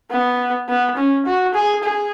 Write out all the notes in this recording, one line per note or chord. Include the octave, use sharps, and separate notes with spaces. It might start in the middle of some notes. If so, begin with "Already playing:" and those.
B3
B3
C#4
F#4
G#4
G#4